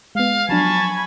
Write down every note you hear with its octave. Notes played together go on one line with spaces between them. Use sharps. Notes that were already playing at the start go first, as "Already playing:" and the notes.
G#3 B3 F5
F3 F#3 D4 G#5 A5 B5 C#6